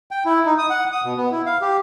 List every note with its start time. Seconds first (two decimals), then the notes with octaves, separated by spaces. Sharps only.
0.11 G5
0.25 E4
0.46 D#4
0.58 D#6
0.70 F#5
0.92 D#6
1.04 B2
1.17 B3
1.31 E4
1.46 F5
1.61 G4